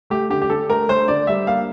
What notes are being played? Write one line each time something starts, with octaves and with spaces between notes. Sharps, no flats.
A3 G4
D3 G4
G4
D3 A4
A3 A#4
A3 C5
D3 D5
G3 E5
A#3 F5